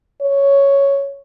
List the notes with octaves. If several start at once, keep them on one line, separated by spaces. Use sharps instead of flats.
C#5